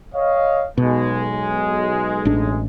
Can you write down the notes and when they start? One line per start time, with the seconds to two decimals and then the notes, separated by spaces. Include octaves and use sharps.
0.14 C#5 D#5 F5
0.78 B1 B2 G#3
2.25 A1 D4